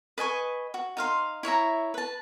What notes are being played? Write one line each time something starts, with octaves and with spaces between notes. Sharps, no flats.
B4 D#5 G#5 C#6
F#4
D#4 F5 C6
E4 C#5 E5 A#5
B4 A5